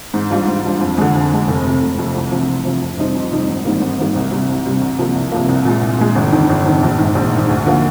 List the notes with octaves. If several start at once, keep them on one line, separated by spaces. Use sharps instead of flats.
G#2
G3 D4 F4
G#2
G3 D4 F4
F2
D3 G#3
F2
D3 G#3
F1
C3
F2
F1
F2 C3
C2
C3 F3
C2
C3 F3
F2
C3 G3 C4 D#4
F2
C3 G3 C4 D#4
G#1
G#2 D#3 G3 A#3
G#1
G#2 D#3 G3 A#3
C2
C3 G3
C2
C3 G3
C2
C3 F3 A#3
C2
C3 F3 A#3
C2
A#2 G#3
C2
A#2 G#3
G1
F2 D#3
G1
F2 D#3
A#1
G#2 D#3
A#1
G#2 D#3
D2
D3 F3 A#3